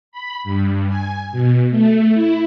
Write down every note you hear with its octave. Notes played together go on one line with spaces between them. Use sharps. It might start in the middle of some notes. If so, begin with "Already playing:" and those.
B5
G2
G#5
B2
A3
E4